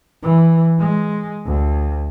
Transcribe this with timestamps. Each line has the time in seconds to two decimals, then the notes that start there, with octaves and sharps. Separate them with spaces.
0.23 E3
0.80 G#3
1.46 D2